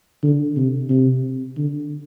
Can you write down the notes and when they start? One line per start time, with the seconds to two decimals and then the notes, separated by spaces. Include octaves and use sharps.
0.23 D3
0.57 C3
0.89 C3
1.57 D3